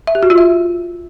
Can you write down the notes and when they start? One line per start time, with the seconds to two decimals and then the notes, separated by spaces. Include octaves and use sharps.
0.07 E5
0.15 G4
0.23 F#4
0.30 F4
0.38 E5